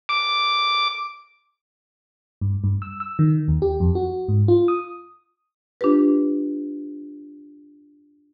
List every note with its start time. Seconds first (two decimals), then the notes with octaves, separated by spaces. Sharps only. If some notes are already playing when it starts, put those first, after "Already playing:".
0.09 D6
2.41 G2
2.64 G2
2.82 E6
3.00 E6
3.19 D#3
3.48 D#2
3.62 G4
3.80 F2
3.95 F#4
4.28 G#2
4.48 F4
4.68 D#6
5.81 D4 F4 G4 B4